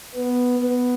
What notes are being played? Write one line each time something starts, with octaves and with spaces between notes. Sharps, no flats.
B3
B3